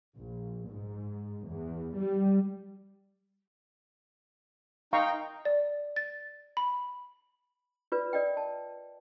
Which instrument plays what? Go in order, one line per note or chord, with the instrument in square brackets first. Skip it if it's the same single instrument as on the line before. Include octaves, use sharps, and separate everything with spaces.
[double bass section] A#1
G#2
E2
G3
[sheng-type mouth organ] D#4 G5 [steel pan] F5 A#5 C#6
[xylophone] D5
A6
B5
[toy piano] F4 B4 D5
A#4 D5 D#5 G5
A5